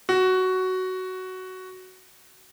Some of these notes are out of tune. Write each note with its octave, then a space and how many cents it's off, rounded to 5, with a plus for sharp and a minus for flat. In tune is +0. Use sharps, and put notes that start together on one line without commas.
F#4 +10